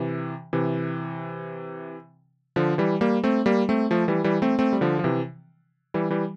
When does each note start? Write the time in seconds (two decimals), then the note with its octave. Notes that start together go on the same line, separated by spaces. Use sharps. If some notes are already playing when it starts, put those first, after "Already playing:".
Already playing: C3 E3
0.53 C3 E3
2.56 D3 F3
2.78 E3 G3
3.01 G3 A#3
3.24 A3 C4
3.46 G3 A#3
3.69 A3 C4
3.91 F3 A3
4.08 E3 G3
4.24 E3 G3
4.42 A3 C4
4.59 A3 C4
4.73 G3
4.81 D3 F3
4.99 F3
5.04 C3 E3
5.94 E3 G3
6.10 E3 G3